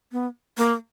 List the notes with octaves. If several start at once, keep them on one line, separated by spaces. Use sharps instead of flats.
B3
A#3